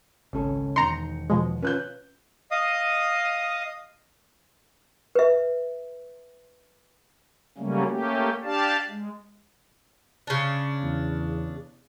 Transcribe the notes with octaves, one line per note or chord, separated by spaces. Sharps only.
G#1 C#2 C#4 A4
E1 D#3 D#4 A#5 C6 C#7
B2 F3 G#3
C#4 F4 B4 F#6 G6
D#5 F5 D#6
B4 E5
C#3 F#3 G3 A3 A#3 C#4
A3 A#3 C#4 G4
D4 G4 D5 F5 A5
G#3
C#3 D4
E2